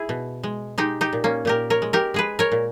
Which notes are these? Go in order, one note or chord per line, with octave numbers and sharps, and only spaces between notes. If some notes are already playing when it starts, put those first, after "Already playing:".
Already playing: E4 G#4
B2
G#3
G#3 D#4 G4
D#4 G4
A#2
A#3 C#4
A#2 G4 A#4
A#4 C#5
G#3
G4 A#4
G#3 G#4 B4
A#4 C#5
A#2